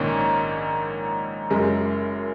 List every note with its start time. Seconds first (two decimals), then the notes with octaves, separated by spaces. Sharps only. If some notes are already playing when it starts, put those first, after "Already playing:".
Already playing: A#1 G#2 D#3 A#3 C#4
1.50 F#1 F#2 C#3 G#3